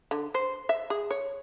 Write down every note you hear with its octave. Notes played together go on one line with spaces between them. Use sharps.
D3
C5
E5
G#4
C#5